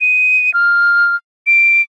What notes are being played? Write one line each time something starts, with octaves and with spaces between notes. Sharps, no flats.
D#7
F6
D7